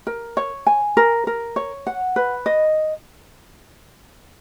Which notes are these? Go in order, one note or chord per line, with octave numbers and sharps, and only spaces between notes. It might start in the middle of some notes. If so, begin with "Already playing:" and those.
A#4
C#5
G#5
A#4
A#4
C#5
F#5
B4
D#5